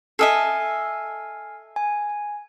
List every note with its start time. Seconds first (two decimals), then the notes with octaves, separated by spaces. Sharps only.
0.19 A4 D#5 E5 G#5 F6 C7
1.76 G#5